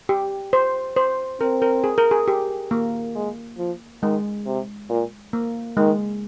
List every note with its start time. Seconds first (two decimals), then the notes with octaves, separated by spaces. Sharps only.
0.09 G4
0.53 C5
0.97 C5
1.40 C4 A#4
1.62 A#4
1.84 G#4
1.98 A#4
2.11 G#4
2.28 G4
2.71 A#3
3.15 G#3
3.58 F3
4.02 D#3 G#3
4.46 C3
4.89 A#2
5.33 A#3
5.77 D#3 G#3